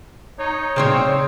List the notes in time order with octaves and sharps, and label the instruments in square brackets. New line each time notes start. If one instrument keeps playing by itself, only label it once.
[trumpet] D#4 [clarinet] C#5
[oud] C#3 C5 C#5 [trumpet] C4 [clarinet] G#4